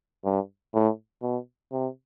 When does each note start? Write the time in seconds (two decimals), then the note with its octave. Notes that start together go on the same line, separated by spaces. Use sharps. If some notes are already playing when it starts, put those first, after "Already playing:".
0.24 G2
0.74 A2
1.22 B2
1.72 C3